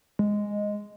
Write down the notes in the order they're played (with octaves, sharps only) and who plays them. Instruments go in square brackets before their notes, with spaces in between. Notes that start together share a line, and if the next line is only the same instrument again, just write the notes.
[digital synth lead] G#3